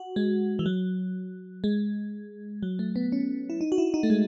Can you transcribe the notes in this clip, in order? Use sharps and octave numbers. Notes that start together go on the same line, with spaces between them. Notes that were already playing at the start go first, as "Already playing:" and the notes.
Already playing: F#4
G#3
E3
F#3
G#3
F#3
A3
B3
C#4
E4
D#4
F#4
E4
D#4
A3
G#3